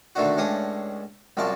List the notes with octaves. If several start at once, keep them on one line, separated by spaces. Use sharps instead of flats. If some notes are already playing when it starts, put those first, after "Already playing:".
A#2 D3 D#3 A3 D4 F#4
C#2 A2 C#4 D4 D#6
C2 F#2 F4 D5 A5 C#6